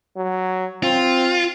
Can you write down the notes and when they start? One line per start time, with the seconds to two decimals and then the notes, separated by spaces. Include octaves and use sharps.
0.17 F#3
0.83 C4 F4